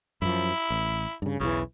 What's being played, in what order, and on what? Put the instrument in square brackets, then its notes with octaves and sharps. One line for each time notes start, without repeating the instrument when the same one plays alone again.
[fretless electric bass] F#2 F3 [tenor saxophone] E4
[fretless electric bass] A1
G2 C#3
[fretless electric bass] B1 E2 E3 [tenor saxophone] C#3